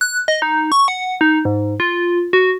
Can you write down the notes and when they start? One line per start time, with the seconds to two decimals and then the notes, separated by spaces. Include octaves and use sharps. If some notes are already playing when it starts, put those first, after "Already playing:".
0.01 F#6
0.28 D#5
0.42 D#4
0.72 C#6
0.88 F#5
1.21 D#4
1.45 G#2
1.80 F4
2.33 F#4